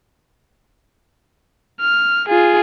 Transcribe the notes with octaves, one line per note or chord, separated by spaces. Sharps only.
F6
F4 G#4